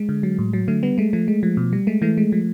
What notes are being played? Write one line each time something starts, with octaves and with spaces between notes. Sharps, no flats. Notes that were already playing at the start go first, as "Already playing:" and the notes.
Already playing: G#3
D3
F#3
A2
F#3
D3 A3
G3 B3
G#3 A3
F3 A3
G#3
F3
B2
G3
G#3 A3
E3 A3
G#3
F3